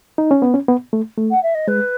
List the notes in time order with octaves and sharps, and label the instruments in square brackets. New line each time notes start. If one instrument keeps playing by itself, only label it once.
[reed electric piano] D#4
C#4
B3
C#4
B3
A3
A3
[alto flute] F#5
E5
D#5
[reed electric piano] G#3 [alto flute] B4